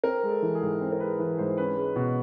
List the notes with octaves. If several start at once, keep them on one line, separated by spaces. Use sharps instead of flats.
C4 A#4
G#3
A4
E3
G#4
G#2
C4
A#4
G#3 B4
E3 B4
G#2 C5
C#4 B4
G#3
B2